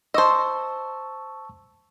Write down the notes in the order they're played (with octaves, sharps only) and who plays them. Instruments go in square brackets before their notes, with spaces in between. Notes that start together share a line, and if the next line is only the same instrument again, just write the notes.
[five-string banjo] C5 D#5 [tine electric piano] A5 C#6 E6